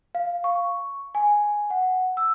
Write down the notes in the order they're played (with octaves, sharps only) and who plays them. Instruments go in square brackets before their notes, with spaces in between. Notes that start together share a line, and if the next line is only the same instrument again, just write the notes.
[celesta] F5
C#6
G#5
F#5
E6